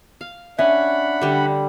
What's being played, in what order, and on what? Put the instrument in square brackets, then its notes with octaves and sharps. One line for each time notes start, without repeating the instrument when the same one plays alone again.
[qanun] F5
[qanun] C#4 [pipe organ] D4 F#5 B5 [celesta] E5
[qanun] D3 G3